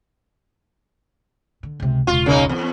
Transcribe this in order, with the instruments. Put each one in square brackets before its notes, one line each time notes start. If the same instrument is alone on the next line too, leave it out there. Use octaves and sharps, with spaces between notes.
[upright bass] D3
C#2 C3
[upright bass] E1 C#2 [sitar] F4
[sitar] C#3 A#3 D#4
E2